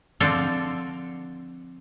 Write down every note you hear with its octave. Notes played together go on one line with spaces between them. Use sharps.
D3 F3 C4 D4 A4